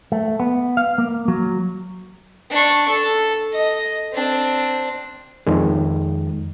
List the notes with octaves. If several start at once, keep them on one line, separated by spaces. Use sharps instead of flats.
A3
B3
F5
A#3
F#3
D4 C#6
A4
D#5
C4 D4
F2 D#3 G#3